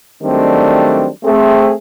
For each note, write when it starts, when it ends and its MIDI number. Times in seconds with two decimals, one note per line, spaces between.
0.23 1.08 51
0.23 1.08 54
0.23 1.08 55
0.23 1.08 57
0.23 1.08 60
0.23 1.08 62
1.24 1.73 57
1.24 1.73 60
1.24 1.73 68